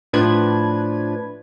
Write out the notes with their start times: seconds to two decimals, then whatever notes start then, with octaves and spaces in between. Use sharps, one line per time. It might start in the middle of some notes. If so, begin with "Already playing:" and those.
0.13 A2 F3 D4 B4 G#6